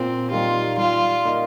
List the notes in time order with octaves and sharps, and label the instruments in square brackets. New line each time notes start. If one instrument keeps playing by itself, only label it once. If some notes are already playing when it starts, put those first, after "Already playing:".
Already playing: [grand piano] A#2 [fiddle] C4
[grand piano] G3 A#3 D#4 G4 [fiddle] F4
[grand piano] G3 [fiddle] F4
[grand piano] A#3 D#4 A#4